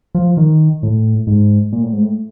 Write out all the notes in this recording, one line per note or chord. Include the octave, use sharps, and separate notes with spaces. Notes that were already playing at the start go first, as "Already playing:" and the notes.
F3
D#3
A2
G#2
A#2
A2
G#2
A2